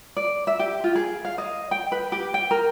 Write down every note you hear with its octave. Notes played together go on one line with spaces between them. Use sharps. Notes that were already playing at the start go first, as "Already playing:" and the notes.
D5
E5
G4
F4
G#4
F5
D#5
G5
B4
G4
G5
A#4